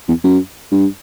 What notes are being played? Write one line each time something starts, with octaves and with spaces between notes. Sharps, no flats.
E2
F#2
G2